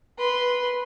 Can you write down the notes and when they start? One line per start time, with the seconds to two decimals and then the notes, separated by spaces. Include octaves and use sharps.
0.18 B4 C6